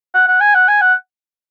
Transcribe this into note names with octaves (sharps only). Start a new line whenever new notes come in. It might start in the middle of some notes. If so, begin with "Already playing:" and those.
F#5
F#5
G#5
F#5
G#5
F#5